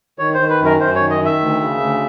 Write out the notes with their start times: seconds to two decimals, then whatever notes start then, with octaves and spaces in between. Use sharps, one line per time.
0.19 D#3 C#5
0.34 C5
0.40 D#3
0.50 B4
0.60 F#2
0.65 A#4
0.80 F#2 C5
0.95 D#3 C#5
1.10 D#5
1.20 D#3
1.25 E5
1.40 D2
1.61 C#3
1.80 D2